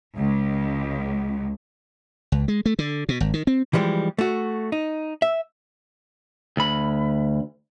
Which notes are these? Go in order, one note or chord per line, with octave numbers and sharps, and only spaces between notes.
C#2
C#2
G#3
A3
D3
B2
G#1
D#3
C4
E3 F3 G3 G#3
A3 F#4
D#4
E5
D2 B5